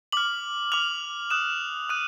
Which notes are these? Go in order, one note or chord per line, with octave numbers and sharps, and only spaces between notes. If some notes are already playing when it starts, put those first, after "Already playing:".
D6 F6 F#7
D6 F6 F7
D#6 F#6 E7
D#6 F#6 D#7